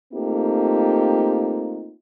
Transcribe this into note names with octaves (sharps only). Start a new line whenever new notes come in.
A3 A#3 C4 D#4 F4 G4